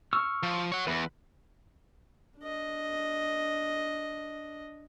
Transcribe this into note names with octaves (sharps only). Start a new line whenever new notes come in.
C#6 E6 F6
F3
C#5 F#5
E2 B4 B5
D4 D#5